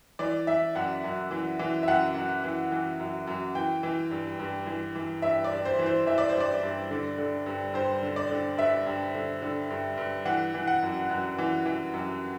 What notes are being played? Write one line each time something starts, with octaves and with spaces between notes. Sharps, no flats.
E3 D5
E3 E5
F#2 F#5
F#2
E3
E3
E5
F#2 F#5
F#2
E3
E3
F#2
F#2
E3 G5
E3
G2
G2
E3
E3
G2 E5
D5
G2
C5
E3
C5
E3 E5
D5
C5
G2
D5
G2
D3
D3
G2
G2 C5
D3
D5
D3
G2 E5
G2
D3
D3
G2
G2
E3 F#5
E3
F#5
F#2
F#2
E3
E3
F#2